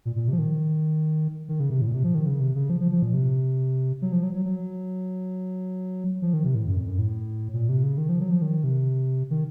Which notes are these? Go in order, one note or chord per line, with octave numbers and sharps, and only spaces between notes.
A#2
A#2
C3
F3
D#3
D#3
C#3
C3
A2
A#2
C3
F3
D#3
C#3
C3
C#3
F3
F3
F3
A#2
C3
F#3
F3
F#3
F#3
F#3
F3
D#3
C3
A2
F#2
F2
F#2
A2
A#2
C3
C#3
D#3
F3
F#3
F3
D#3
C3
D#3